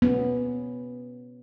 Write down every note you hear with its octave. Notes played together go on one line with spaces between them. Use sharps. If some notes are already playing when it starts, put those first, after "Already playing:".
B3 C#4